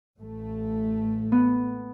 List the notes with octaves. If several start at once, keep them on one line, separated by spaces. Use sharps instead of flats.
A1 A3
B3